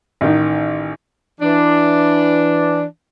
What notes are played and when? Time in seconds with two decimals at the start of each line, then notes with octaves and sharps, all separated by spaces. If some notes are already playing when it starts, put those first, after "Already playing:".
0.21 A1 D#3
1.41 E3 D4